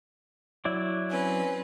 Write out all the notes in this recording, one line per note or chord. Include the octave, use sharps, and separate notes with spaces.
F#3 E4 D5
C4 C#4 B4